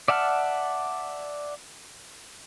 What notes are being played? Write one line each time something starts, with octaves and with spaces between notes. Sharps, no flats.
D5 E5 F#5 A5 F6